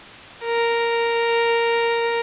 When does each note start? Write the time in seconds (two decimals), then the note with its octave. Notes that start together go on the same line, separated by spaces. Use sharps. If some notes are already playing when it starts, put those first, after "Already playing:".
0.44 A#4